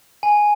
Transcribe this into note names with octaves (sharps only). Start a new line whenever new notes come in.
G#5